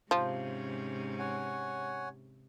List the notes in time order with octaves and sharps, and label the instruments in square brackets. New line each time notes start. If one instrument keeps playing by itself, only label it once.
[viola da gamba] G#2 C3 C#4 [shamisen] F3
[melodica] C#5 F#5 G#5